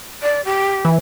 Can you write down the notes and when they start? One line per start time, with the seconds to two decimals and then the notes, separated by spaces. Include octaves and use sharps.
0.23 D5
0.45 G4
0.85 E3